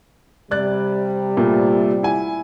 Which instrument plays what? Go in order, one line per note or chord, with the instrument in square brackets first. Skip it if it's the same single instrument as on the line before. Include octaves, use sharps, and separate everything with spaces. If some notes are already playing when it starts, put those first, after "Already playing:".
[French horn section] C3 G3 [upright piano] D5 F#6 A6
[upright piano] A#2 A3
E4 G#5